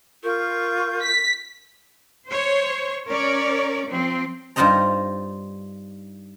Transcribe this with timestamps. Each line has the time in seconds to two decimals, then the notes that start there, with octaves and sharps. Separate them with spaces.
0.24 F4 A#4 C#6 G6
1.01 B6
2.28 C5 C#5
3.08 C#4 A#4 C#5 D5
3.87 F3 C4
4.56 G2 D#4 F4 C5 D#5 A#5